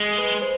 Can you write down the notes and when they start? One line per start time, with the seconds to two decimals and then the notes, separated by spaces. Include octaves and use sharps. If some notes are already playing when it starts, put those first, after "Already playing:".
Already playing: G#3
0.18 B4
0.42 C5